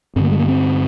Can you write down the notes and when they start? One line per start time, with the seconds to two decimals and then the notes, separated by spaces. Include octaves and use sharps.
0.16 G2 C4
0.20 D3 A#3
0.31 G#3
0.39 A#3
0.48 C4